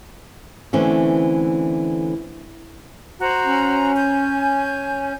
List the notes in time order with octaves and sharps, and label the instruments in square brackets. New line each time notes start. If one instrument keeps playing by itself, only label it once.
[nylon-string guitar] D3 E3 A3 C4 C#4
[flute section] F#4 C5 A#5
[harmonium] C#4
[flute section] G#5 G6